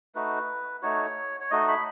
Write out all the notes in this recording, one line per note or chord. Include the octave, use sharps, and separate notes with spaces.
A3 D#4 F#4 B4
A3 D#4 F#4 C#5
C#5
A3 D#4 F#4 D#5
B5